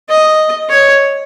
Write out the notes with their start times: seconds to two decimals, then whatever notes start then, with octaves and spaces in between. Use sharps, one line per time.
0.09 D#5
0.70 C#5